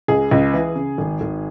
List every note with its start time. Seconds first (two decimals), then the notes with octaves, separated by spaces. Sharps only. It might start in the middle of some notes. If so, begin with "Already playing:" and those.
0.08 C#2 G#4
0.31 C#2
0.54 E3
0.76 C#3
0.98 G#1
1.21 G#1